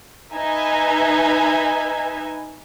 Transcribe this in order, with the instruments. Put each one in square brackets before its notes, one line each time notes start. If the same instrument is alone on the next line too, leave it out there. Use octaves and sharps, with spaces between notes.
[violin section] D#4 B4 E5 G#5